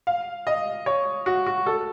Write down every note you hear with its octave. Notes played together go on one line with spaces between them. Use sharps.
F5
D#5
C#5
F#4
F#4
A4